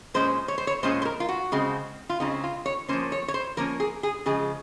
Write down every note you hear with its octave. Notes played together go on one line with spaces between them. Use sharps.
A#2 G#3 C#4 C5
C#5
C5
C#5
A#2 G#3 C#4 C5
C5
A#4
F4
F#4
C#3 G#3 C4
F4
C#3 G#3 C4 D#4
F4
C#5
F3 A#3 C#4 C5
C#5
C#5
C5
F3 A#3 C#4 A#4
G#4
G#4
C#3 F3 G#3 G#4